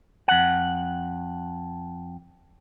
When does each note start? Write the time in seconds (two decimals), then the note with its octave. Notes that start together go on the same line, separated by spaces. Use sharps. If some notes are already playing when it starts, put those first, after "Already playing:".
0.28 F2 F#5